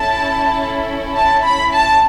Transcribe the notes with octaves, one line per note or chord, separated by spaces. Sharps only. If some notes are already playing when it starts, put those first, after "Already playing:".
Already playing: C#4 E4 A4 A5
A5
B5
A5